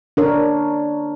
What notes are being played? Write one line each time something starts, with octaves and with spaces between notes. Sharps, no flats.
D4 A#4 C#5